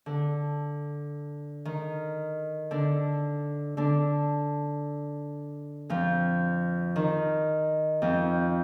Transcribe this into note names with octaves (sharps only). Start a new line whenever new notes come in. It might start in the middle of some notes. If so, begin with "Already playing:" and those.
D3
D#3
D3 D4
D3 D4
F2 F3
D#3
F2 F3